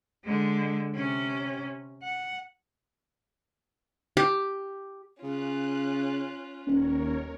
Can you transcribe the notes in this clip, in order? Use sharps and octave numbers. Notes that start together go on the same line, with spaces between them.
D3 G#3
C3 C#4
F#5
G4
C#3 C#4 F4 F#6
D#1 D#2 C#4 A#4 C#5